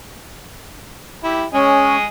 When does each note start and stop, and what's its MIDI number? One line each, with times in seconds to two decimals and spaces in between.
1.24 1.44 64
1.24 1.44 67
1.54 2.06 56
1.54 1.96 61
1.54 2.06 68
1.54 2.06 75